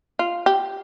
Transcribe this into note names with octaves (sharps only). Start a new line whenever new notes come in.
F4
G4